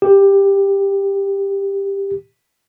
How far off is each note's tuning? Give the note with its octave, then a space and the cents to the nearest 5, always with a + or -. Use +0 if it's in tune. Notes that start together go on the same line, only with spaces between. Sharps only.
G4 +10